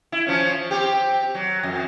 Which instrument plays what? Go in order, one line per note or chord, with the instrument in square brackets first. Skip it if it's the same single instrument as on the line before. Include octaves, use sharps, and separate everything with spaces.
[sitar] E4
F3 C#4
C4 G4
F#3
F2